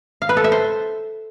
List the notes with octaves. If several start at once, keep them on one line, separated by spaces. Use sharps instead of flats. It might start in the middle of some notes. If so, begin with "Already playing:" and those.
F5
B4
A4
E5
C5